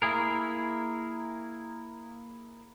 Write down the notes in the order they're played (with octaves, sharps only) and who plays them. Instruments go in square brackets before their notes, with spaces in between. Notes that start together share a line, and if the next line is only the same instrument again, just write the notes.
[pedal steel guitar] A#3 E4 G#4 A#4